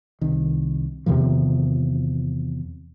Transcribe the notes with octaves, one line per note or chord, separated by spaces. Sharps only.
C2 D#3
E2 C3 D#3 F3